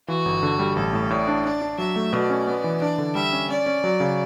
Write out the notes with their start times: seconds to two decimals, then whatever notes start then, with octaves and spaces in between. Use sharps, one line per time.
0.08 E3 F#4
0.25 G1
0.43 D3
0.59 G3
0.76 A1 A4
0.93 A2
1.10 A2 D5
1.28 D4
1.45 D4 D5
1.62 D4
1.78 F#3 E5
1.96 A3
2.13 B2 D5
2.30 C#4
2.47 B3
2.64 E3
2.81 D4 D5
2.98 D3
3.15 G3 E5
3.33 C#4
3.49 C#4 D5
3.66 C#4
3.84 F#3
4.00 C#3